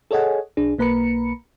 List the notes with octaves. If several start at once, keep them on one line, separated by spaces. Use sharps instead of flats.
G#4 A4 C#5 D#5 F#5 G#5
B1 D4 G#4
B1 A#3 B4 A#5 B5 C#7